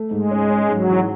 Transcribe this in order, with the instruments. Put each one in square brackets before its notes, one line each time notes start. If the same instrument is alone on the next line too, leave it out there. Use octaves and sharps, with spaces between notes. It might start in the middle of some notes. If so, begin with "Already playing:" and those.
Already playing: [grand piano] A3
[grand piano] G#2 [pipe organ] G#3
[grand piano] C#4
C#4
[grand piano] G#2 [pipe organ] F#3
[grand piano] E3